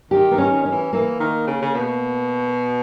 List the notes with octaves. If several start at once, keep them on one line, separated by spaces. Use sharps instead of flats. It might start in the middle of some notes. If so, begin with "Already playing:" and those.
D#3 G4
D#3 B3
C#4
D#3
C#4
E3
E3 A#3
D#3
C#3
C#3
B2